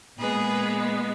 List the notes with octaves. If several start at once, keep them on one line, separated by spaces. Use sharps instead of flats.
A#2 G#3 B3 G#4 B4